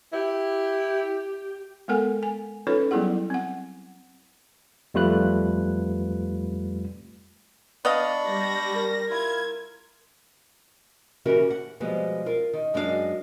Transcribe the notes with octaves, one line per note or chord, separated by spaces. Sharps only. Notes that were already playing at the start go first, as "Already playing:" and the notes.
E4 G4
G#3 B3 A4 A#4 F#5 G#5
G#5
C#4 D#4 F4 A4 B4 C#5
F#3 G3 B3 E4 G#4 F#5
C4 F#5
F2 G3 A3 F4 B4 F#6
B3 D4 D5 D#5 F5 B5 C#6
G3 A#6
A#4
E4 F4 G#6
C#3 E3 C#4 F#4 G4 A#4
F#5
B2 F3 G3 G#3 B3
F4 A#4 F5
D#3
F#2 G#3 D4 F#4 G#4 F5